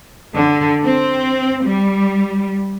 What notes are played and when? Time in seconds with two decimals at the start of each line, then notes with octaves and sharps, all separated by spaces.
0.34 D3
0.83 C4
1.64 G3